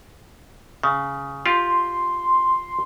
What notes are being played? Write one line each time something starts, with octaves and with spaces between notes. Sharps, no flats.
C#3
F4 G4 C6